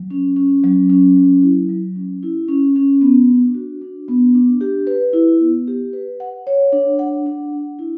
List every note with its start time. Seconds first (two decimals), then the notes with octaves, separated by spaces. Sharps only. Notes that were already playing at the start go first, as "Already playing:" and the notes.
Already playing: F#3
0.10 C#4
0.36 C#4
0.64 F#3
0.89 C#4
1.17 F#3
1.42 E4
1.69 F#3
1.96 C#4
2.23 E4
2.48 C#4
2.76 C#4
3.01 B3
3.29 D4
3.55 F#4
3.81 D4
4.08 B3
4.35 D4
4.61 G4
4.87 B4
5.13 E4
5.40 B3
5.68 G4
5.93 B4
6.20 F#5
6.47 C#5
6.72 D4
6.99 F#5
7.26 D4
7.53 D4
7.79 E4